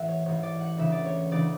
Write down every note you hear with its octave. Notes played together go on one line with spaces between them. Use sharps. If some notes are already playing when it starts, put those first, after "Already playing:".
Already playing: A1 G#2 E3 E5 F#5
C#5
A1 G#2 E3 C#5
D5
F#5
D2 C#3 E3 E5
D5
C#5
D2 C#3 E3 D5